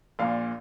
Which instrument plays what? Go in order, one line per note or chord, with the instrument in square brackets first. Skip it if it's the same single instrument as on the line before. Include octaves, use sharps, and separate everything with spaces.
[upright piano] A#1 A#2 F5